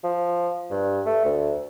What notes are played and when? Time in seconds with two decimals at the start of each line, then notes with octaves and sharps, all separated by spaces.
0.04 F3
0.71 G2
1.06 A3
1.25 D2